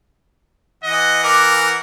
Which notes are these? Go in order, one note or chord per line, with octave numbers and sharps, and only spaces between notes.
E3 D#5 F#5
A#4 D6